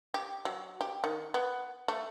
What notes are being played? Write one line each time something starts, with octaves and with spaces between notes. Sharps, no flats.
G4
F#3
G4
D#3
B3
A3